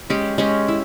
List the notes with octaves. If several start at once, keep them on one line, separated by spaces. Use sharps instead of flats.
G#3 C#4 G4
G#3 C#4 G4
E4